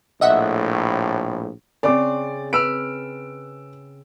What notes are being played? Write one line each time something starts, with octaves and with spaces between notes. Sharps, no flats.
A#1 A2 D#5 E5 F#5
C#3 C4 D5 D6
B4 E6 F6 D7